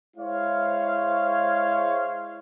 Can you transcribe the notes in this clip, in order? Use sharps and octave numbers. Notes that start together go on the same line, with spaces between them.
G#3 E4 C5 C#5 F5